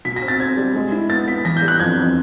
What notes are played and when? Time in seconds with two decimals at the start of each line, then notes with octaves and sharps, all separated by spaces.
0.05 B2 B6
0.16 A#6
0.22 C4
0.28 A6
0.40 C4 G#6
0.57 G3
0.75 G#3
0.92 E4
1.10 B3 A6
1.27 B3 B6
1.45 E3 A#6
1.57 G6
1.62 G3
1.68 F#6
1.79 F2 G#6
1.97 F2